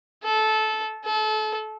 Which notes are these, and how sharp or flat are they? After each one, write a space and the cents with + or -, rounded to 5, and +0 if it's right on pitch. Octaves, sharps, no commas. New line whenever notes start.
A4 -15
A4 -30